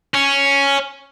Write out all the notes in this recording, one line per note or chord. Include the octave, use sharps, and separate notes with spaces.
C#4